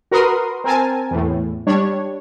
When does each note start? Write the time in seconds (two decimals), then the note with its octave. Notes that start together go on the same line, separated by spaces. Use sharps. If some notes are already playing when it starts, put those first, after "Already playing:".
0.11 F#4 A#4 B4 C6 D#6
0.64 C4 A#4 G#5 A5
1.11 E2 A2
1.67 G3 D4 C#5